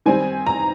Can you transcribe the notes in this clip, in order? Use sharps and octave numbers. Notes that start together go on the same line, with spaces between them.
D#3 G3 C4 G#5
A#5